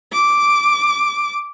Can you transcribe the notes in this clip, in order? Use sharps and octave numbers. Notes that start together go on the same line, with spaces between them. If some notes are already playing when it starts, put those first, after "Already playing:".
D6